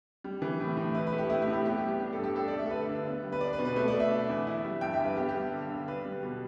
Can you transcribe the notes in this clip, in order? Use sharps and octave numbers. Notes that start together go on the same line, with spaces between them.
G3
E3
A2
A2
E4 B4
B4
A3
G4
A2 E4
G4
A2
G4
B3 G4
G4
G3
G4
D4 G4
A4
G2
G4
D4 A4
D5
A3 E5
A4
D3 B4
D3
B3
G3
B4
D4 D5
B4
B2
B4
A3 B4
D5
B2
E5
D4
E2
E4
G3
G2 G5
E5
G2
B4
B3 G4
G4
G3
D3
D3
D4 B4
G3
B2